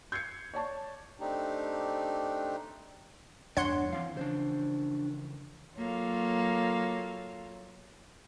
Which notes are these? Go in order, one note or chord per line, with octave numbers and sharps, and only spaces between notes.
G6 G#6 C7 C#7
C#5 D5 A5 C#6
A3 C4 D4 D#4 G4
E2 G2 G3 D4 C#5 F#5 C6
E3 F3 C4 F5
C#3 E3 F3 D4 C5
F#3 A#3 F4 A4 C#5 F5